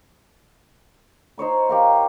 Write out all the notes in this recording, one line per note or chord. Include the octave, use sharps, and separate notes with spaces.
D#4 C5 C#5 B5
G4 A#4 F5